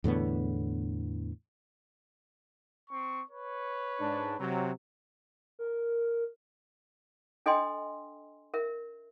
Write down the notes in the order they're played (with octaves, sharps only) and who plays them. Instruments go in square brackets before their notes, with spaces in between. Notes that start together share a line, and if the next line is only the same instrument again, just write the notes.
[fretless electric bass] E2 A2 D3 B3
[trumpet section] C4 C#6
B4 C#5
[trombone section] G#2 D4
C3 F#3
[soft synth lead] A#4
[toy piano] D4 A4 D#5 G5 G#5 C6
A#4 E5